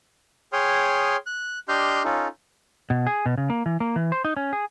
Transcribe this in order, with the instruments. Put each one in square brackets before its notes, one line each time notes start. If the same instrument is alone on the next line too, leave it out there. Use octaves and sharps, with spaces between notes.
[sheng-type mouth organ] G#4 C#5 G5 C6 D#6 F6
F#6
D4 G4 D#5 C6 F6 G6
C#4 D#4 F4 A4
[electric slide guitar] B2
G#4
B2
C#3
A#3
E3
A#3
E3
C5
D#4
C#4
G#4